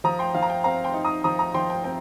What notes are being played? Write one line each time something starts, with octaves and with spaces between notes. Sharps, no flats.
F3 A#5 D#6
G5 C6
F3 F5
A#5
G5
C4 F5 A#5
G5 C6
D#4
A#5 D#6
F3 A#5 D#6
A#5 D#6
F3 G5 C6
G5
C4 G5